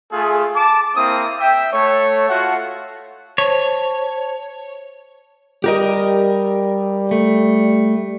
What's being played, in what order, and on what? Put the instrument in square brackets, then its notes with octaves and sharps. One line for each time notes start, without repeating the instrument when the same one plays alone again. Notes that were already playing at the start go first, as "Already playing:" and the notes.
[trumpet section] A3 F4 G#4
A5 D6
A#3 C4 E4 D#6
E5 G5
A3 C#5
F4 F#4 A4 E5 F#5
[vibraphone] C5 A5 [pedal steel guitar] C#5
[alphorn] G3 [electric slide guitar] G4 A#4 D#5
[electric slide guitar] A3